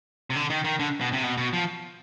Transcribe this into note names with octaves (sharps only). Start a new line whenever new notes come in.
C3
D3
D#3
D#3
D3
B2
C3
B2
B2
F3